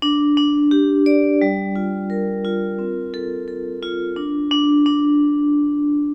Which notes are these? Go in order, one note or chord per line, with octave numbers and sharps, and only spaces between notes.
D4
D4
G4
D5
G3
F4
A#4
F4
C4
A4
A4
F4
D4
D4
D4